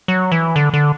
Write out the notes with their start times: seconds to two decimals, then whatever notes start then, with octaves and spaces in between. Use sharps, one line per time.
0.08 F#3
0.32 E3
0.56 D3
0.73 D3